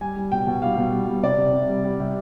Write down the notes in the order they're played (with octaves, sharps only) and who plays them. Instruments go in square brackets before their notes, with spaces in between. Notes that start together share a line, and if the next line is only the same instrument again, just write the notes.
[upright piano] G3 G#5
G3
B2 G5
B2
G3 F5
B2
G3
G3
C3 D5
C3
C3
G3
G3
C3